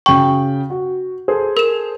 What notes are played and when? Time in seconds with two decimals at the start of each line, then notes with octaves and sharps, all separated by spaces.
0.06 C#3 F#4 G5 C#6
0.70 F#4
1.28 G#4 A4 C5
1.57 A#4 E7